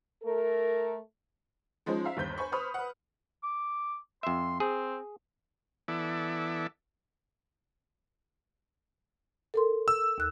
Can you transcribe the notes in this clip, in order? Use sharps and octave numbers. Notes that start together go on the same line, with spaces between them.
A3 A4 A#4
F3 G#3 C#4 D#4 C5
E5 F5 A#5
G1 D#2 C5 G6 B6
C5 G#5 B5 C#6
B4 C5 B5 C#6 D#6 F6
B4 F#5
D6
F2 E5 C6
C4 G#4
E3 B3 E4 A4 D5
A4 A#4 C6
E6
D#2 F#6